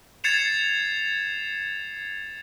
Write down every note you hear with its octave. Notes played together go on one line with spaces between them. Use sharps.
G#6 A6 C7 C#7 E7 F7